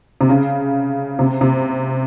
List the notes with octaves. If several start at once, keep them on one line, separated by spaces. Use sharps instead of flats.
C3
C#3
C3
C3